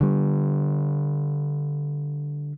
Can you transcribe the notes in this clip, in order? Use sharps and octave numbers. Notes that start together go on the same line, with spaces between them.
D3 G3